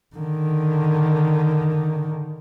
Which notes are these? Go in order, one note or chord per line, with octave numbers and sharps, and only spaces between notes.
D3 D#3